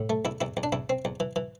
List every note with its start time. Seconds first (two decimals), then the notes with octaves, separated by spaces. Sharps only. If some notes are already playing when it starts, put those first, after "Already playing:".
Already playing: A2
0.10 A3
0.25 E2 E4
0.41 E2 E4
0.57 E2
0.63 D4
0.72 E2 E4
0.90 C4
1.05 E2
1.20 E3
1.36 E3